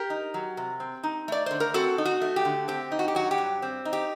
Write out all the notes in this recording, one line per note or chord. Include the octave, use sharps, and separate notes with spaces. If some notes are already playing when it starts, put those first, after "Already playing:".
Already playing: G4 A#4
D#4
F#3
C3
C4
D#4
A3 D5
D3 C5
A#4
C4 F#4 A4
D#4
F#4
A3
G4
D3
C4 G4
D#4
F#4
G4
F#3 F#4
G4
G2
C4
D#4
G4